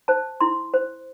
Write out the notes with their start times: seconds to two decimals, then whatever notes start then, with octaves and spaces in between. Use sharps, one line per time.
0.08 C5 A5
0.41 E4 C6
0.74 C5